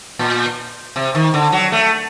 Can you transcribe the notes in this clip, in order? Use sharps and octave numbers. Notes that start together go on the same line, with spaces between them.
A#2
C3
D#3
D3
F#3
A3